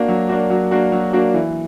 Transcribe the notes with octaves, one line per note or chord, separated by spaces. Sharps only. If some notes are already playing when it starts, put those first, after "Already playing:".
Already playing: A#3 D4 F#4
F#3
A#3 D4 F#4
F#3
A#3 D4 F#4
F#3
A#3 D4 F#4
E3